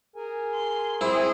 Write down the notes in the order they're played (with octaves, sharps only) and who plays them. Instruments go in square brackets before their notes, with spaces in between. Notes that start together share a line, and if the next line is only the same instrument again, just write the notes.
[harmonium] G#4 A#4 G#5
[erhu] C6
[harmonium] C4 [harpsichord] E4 [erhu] G#4 [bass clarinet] C5